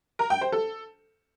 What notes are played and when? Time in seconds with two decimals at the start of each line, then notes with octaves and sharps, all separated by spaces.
0.19 A#4
0.30 G5
0.41 C5
0.52 A4